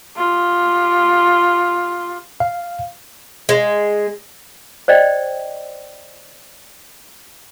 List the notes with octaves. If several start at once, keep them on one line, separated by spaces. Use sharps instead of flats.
F4 G4
F5
G#3
C5 D5 D#5 G5